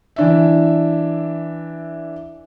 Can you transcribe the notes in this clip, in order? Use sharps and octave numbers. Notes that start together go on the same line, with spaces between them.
E3 D4 E5